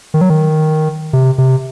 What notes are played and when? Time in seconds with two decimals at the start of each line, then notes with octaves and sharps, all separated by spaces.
0.14 D#3
0.21 F#3
0.30 D#3
1.13 C3
1.38 C3